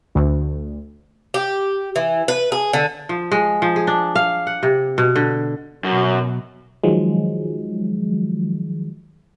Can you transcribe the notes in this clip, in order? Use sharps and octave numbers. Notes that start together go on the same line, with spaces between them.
D2
G4
E3
B4
G#4
D3
F3
G#3
F3
G#4
D4
F5
F#5
C3
B2
D3
F#2 B2 F#3
D#3 F3 F#3 G#3